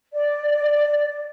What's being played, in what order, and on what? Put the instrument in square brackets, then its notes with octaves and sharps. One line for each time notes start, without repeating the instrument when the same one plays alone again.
[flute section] D5